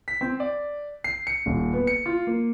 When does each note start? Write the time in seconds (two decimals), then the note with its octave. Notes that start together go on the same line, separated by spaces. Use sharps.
0.08 B6
0.21 C4
0.40 D5
1.04 C7
1.27 C#7
1.46 D#1
1.73 B3
1.87 C#7
2.06 F4
2.27 A#3